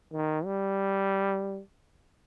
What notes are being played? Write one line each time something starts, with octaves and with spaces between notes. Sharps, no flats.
D#3
G3